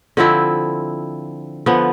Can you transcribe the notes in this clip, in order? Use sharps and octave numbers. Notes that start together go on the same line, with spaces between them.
D3 F3 C4 E4
D3 F3 B3